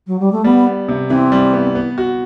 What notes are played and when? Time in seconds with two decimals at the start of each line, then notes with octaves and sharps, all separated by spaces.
0.07 F#3
0.19 G3
0.32 A3
0.44 G3 B3
0.66 B3
0.88 C3
1.10 E3 C4
1.32 G3
1.53 B3
1.75 B3
1.98 F#4